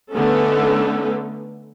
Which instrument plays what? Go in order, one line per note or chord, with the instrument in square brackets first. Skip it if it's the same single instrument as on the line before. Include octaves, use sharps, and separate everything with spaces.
[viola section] D3 A3 B3 C#4 D#4 A4